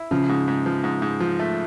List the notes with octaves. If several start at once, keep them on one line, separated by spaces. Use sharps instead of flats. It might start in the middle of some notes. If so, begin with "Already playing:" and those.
Already playing: E4
C#3 F3
G#2
G#2
F3
G#2
G#2
F3
A3